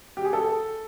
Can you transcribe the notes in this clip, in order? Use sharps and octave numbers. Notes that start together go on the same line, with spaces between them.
G4
G#4
A4